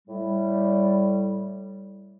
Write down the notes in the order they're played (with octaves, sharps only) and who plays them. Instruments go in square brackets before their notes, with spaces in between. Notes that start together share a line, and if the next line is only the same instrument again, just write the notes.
[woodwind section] A2 G3